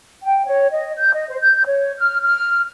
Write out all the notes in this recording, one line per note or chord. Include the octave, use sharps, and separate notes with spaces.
G5
C#5
D#5
G6
D#5
C5
G6
C#5
F6
F6